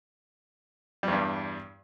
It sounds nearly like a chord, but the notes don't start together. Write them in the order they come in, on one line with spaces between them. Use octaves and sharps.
G3 E2 G2